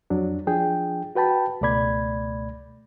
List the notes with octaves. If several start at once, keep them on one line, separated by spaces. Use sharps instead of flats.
F2 F#3 D4
F3 D4 G#4 G5
F#4 B4 G5 A5 B5
C#2 B2 A3 D5 B5 G#6